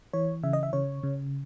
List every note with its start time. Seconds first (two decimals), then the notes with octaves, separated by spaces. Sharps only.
0.13 E3 C#5
0.43 C#3 E5
0.53 D#5
0.63 E5
0.73 C#3 C#5
1.03 C#3